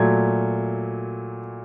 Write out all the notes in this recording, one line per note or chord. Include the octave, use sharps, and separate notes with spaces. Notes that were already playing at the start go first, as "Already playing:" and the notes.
Already playing: A#2 F#3 A3 G#6